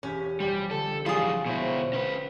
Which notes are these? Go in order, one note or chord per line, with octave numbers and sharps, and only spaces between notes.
E1 C#4 G4 B6
F1 G3 D5 G5
D3 A4
E3 F3 G3 F4 G#4
B2 E4 C5 C#5
C#4 B4